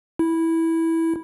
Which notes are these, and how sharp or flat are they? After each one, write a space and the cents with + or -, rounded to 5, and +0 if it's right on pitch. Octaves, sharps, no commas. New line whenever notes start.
E4 -10